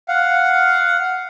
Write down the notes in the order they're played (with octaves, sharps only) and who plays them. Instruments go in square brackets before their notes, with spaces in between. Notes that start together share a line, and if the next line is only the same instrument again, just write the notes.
[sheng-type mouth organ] F5 F#5